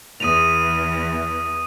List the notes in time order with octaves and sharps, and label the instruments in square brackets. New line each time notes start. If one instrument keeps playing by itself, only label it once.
[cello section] E2 [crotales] D#6 D#7 F7